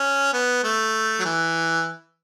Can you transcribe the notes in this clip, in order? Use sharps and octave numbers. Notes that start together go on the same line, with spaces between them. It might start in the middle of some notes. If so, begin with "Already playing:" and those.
Already playing: C#4
B3
A3
F#3
E3